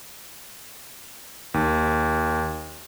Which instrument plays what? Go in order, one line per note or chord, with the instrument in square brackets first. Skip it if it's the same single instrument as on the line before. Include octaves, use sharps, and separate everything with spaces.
[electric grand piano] D#2